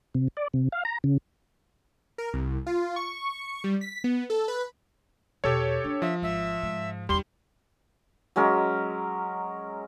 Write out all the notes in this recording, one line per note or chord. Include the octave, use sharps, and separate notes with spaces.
C3
D5
C3
F5
A#5
C#3
A#4
C2
F4
C#6
G3
B6
B3
A4
B4
E2 B2 G4 A4 C#5
D4
F3 E5
G#1 E5
G#2
E2 D3 G3 C6
F#3 G#3 C#4 A#4